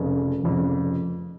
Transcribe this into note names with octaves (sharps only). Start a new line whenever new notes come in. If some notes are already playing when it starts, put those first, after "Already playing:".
Already playing: F1 F2 C#3
F1 F2 C#3